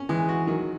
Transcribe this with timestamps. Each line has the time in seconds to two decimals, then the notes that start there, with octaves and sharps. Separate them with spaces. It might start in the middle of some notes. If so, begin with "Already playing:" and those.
Already playing: C#4
0.09 E3 G#3
0.29 F#4
0.47 D#3 F#3